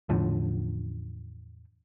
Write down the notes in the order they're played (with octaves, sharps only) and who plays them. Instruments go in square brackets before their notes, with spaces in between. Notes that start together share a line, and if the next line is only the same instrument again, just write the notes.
[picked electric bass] E2 A2 D3 F3